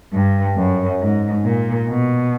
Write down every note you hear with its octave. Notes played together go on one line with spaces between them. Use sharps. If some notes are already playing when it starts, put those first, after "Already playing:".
G2
F#2
G#2
A#2
B2